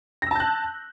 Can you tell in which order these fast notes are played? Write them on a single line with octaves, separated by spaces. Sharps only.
A#6 E6 A5 G6 F#6